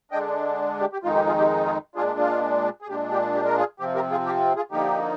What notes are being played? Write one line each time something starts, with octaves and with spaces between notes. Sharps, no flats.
D3 G#3 D4 D#5 G5
G4
G4
F2 D#3 G#3 D#4 F4
G4
F4 G#4
G4
F4 G#4
A#2 G#3 D4 F4 G#4
F4
G#4
A#2 G#3 D4 G4
G4
G4
A#4
F4 G#4
C3 F3 C4 G4
G4 A#4
F4 G#4
G4
F4 G#4
D3 F3 A#3 D#4 G4